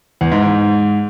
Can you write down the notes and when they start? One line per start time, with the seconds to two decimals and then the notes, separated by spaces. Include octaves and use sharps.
0.21 E2
0.32 G#2
0.42 G#2